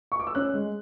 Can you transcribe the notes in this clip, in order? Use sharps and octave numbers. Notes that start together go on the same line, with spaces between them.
C#6
D6
E6
C#4 F#6
G#3